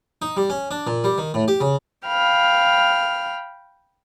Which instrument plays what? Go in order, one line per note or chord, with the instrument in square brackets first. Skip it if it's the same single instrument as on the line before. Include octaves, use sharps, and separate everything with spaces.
[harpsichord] D#4
G3
C#4
D4
A#2
G3
D#3
A2
G4
C#3
[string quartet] F5 G5 B5 F6